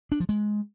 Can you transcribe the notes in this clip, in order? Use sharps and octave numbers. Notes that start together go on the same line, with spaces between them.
D4
F3
G#3